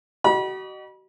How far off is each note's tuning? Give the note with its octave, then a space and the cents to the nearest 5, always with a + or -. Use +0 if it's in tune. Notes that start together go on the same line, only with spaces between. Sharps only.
F#4 +40 D#5 -30 B5 -35